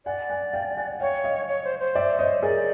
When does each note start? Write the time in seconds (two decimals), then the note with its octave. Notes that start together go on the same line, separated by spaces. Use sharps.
0.06 D5 F#5 G#5
0.30 F#5 G#5
0.53 F5 G5
0.77 F#5 G#5
1.01 C#5 F5 G5
1.24 D#5 F5
1.48 C#5
1.64 C5
1.79 C5
1.95 D5 E5
2.19 C#5 D#5
2.42 G#4 A#4 D5